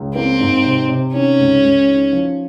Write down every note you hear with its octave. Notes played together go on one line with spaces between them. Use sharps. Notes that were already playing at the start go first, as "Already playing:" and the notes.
Already playing: C#2
A#3 C4
G#2
C3
C3
D#3 C#4
C#2
C#2
D#3
F3